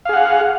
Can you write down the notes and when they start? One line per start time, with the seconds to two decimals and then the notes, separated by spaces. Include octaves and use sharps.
0.05 F5
0.09 G#4
0.13 F#5